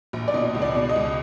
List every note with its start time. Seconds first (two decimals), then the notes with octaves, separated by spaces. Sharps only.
0.13 A#1
0.28 D5
0.34 B2 D#5
0.55 C#2
0.62 D5
0.75 B2
0.89 D#5
0.96 C#2